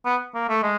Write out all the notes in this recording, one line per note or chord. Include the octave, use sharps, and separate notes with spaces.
B3
A#3
A3
G#3